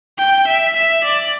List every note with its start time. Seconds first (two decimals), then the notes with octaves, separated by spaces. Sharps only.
0.18 G5
0.48 E5
0.76 E5
1.04 D5